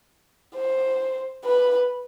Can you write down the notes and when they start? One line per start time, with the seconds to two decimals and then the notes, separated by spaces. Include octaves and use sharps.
0.56 C5
1.45 B4